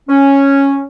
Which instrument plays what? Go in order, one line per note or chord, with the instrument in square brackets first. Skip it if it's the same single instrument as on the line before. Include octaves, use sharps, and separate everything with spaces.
[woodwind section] C#4